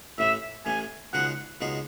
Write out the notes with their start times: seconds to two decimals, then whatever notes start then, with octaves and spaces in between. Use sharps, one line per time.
0.18 A1 A2 E3 E5
0.66 A1 A2 E3 G#5
1.13 C#2 B2 G#3 D#4 G#4 F#5
1.61 C#2 B2 G#3 D#4 G#4